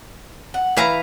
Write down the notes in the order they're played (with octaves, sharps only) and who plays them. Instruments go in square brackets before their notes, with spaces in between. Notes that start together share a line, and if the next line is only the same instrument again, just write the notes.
[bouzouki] F#5
[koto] E3 F5 A#5 [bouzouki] B4